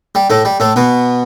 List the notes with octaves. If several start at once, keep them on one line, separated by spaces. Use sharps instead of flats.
G3
A2 A3
G3
A2 A3
B2 B3